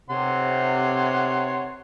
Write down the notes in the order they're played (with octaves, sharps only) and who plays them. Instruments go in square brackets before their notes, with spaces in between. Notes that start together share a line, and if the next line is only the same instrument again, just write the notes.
[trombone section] C3 [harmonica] C#5 F#5 C6